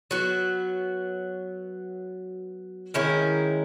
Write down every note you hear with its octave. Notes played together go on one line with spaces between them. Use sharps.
F#3 B3 F#4
D#3 G#3 C#4 E4